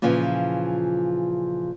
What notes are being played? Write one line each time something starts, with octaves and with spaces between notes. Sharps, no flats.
A#2 C#3 E3 F3